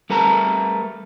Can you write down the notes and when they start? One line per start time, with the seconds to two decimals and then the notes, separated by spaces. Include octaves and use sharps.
0.10 G3 A3 A#4 B4 A5 A#5